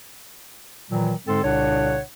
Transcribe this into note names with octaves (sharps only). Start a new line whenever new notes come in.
A#2 D#3 E3 F#3
G#2 D3 G#3 C4 A4 C6
C2 A#2 C#3 D4 C#5 F#5